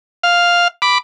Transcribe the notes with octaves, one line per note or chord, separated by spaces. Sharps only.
F5
B5 D6